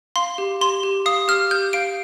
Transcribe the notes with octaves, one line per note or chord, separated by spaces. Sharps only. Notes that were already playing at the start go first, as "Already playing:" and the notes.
F5 C6
G4
G4 C6
G4
F5 D#6
G4 F6
G4 G6
F5 D7